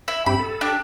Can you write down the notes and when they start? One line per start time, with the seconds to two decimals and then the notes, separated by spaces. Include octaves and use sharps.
0.08 E4
0.26 G2 C4 G4 B5
0.40 A4
0.61 D4 G4